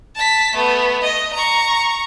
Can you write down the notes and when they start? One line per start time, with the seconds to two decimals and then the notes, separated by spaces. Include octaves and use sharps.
0.15 A5 B6
0.54 A3 B3
1.04 D#5
1.34 A#5 C#6